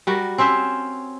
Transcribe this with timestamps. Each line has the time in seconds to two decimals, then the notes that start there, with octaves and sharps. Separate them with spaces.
0.07 G3 F#4 A#4
0.38 C4 C#4 C5 E5